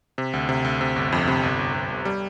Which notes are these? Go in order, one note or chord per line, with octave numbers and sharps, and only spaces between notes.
C3
D2
C3
D2
C3
G1
F2
C3
G1
G1
G1
G1
G3